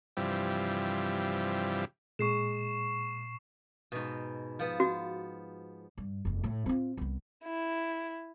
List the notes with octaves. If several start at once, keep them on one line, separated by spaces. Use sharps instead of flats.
G2 C3 E3 F3 G3
A#2 G#3 C#6 C7 E7
G#2 B2
F3 B3
F#4
G2
F1 E2
A2
C4 F4
C2 B3
E4